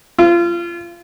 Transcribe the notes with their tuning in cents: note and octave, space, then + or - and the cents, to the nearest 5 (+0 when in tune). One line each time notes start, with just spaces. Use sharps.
F4 -30